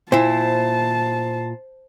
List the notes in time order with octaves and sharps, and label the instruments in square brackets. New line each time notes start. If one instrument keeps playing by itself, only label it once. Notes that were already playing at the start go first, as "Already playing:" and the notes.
[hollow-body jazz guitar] A#2 E4 [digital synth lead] C5 [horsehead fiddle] A5